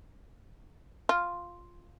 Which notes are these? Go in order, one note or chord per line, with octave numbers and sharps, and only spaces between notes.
F4